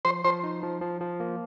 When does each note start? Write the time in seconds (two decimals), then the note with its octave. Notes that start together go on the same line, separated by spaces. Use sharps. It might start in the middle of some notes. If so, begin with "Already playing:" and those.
0.05 F3 C5
0.24 F3 C5
0.44 D#4
0.63 F3
0.81 F3
1.00 F3
1.20 A#3